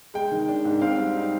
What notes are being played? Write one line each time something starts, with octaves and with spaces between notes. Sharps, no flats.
G#3 G5
D#3
D4
G#2
C4 F5
G3
D#4